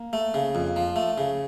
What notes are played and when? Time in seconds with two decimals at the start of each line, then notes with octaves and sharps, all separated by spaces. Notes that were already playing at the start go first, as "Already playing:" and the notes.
Already playing: A#3
0.13 A3
0.34 C#3
0.55 F2
0.76 F3
0.96 A3
1.18 C#3